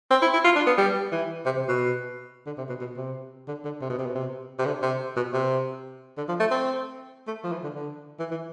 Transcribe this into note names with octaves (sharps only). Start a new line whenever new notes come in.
C4
E4
E4
F4
D4
B3
G3
E3
C3
C3
B2
D3
C3
B2
B2
C3
D3
D3
C3
B2
C3
B2
C3
C3
D3
C3
B2
C3
D3
F3
A3
C4
A3
F3
E3
D3
D3
E3
E3